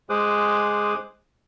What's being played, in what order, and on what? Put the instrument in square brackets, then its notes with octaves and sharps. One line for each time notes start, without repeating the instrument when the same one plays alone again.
[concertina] G#3 G#4 C5 D6 D#6 F#6